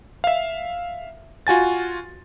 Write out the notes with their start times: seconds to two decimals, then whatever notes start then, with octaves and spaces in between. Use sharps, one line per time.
0.24 E5 F5
1.47 F4 F#4 G#5 A6